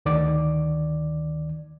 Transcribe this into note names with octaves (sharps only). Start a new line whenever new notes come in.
D2 D#3 D5 D6